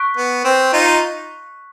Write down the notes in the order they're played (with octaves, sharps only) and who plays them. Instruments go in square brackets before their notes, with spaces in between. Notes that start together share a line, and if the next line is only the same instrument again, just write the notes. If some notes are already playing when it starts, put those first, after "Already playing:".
Already playing: [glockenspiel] C#6 F#6 B6 D7
[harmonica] B3
C4
D#4 F4